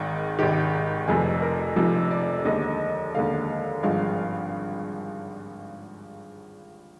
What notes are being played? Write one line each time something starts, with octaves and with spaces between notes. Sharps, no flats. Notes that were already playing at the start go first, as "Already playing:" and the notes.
Already playing: G#1 G#2 D#3
G#1 G#2 D#3 G4
F1 F2 C3 F3 G#4
A#4
F1 F2 C3 F3
D5
D#2 D3 G#3 D#5
D#2 D3 G#3 F5
G#1 G2 F3 G#3 F5